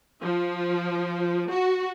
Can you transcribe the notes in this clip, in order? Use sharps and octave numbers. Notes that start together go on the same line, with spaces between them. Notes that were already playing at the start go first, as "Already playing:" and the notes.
F3
F#4